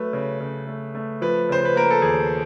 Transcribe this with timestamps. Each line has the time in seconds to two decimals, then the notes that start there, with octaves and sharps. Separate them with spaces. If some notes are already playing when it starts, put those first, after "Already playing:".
Already playing: F#3 A3 B4
0.13 C#3
0.40 C#3
0.67 A3
0.95 A3
1.22 F3 B4
1.49 C#3 C5
1.65 B4
1.75 A#3 A#4
1.91 A4
2.02 D#2 G#4